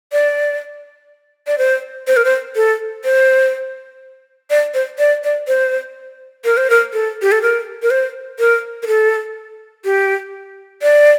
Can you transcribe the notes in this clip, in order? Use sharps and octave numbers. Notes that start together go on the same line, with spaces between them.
D5
D5
C5
C5
A#4
C5
A4
C5
D5
C5
D5
D5
C5
A#4
C5
A#4
A4
G4
A4
A#4
A#4
C5
A#4
A#4
A4
G4
D5